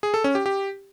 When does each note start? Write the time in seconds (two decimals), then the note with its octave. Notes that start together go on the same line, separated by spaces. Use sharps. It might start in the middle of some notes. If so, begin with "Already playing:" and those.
0.03 G#4
0.14 A4
0.24 C#4
0.35 G4
0.46 G4